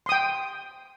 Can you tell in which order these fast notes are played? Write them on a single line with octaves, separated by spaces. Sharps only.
C6 D#6 G5